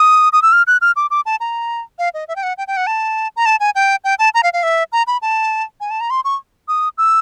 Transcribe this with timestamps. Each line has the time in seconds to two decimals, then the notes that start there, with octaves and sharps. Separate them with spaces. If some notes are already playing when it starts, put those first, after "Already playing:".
Already playing: D#6
0.33 D#6
0.42 E6
0.52 F6
0.67 F#6
0.81 F6
0.96 D6
1.11 D6
1.26 A5
1.40 A#5
1.99 F5
2.14 D#5
2.28 E5
2.36 G5
2.43 F#5
2.58 G5
2.68 G5
2.77 F#5
2.87 A5
3.36 A#5
3.46 A5
3.60 G#5
3.75 G5
4.04 G5
4.19 A5
4.34 A#5
4.43 F5
4.53 F5
4.63 E5
4.92 A#5
5.07 B5
5.22 A5
5.80 G#5
5.90 A5
6.01 A#5
6.10 C6
6.25 C#6
6.68 D#6
6.98 E6